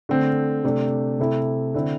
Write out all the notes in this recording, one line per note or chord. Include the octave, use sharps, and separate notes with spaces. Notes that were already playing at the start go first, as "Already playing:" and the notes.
D3 A3 C4
C3 A3 D4
C3 A3 E4
D3 C4 E4